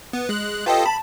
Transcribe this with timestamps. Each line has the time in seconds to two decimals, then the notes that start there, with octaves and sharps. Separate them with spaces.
0.13 B3
0.29 G#3 F#6
0.66 F4 G4 A4 B4 C#5 D#5
0.86 A5 B5